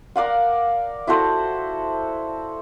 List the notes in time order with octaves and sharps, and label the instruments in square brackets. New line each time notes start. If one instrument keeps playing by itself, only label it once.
[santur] A#4 D5 F5 F#5
E4 F#4 A4 C5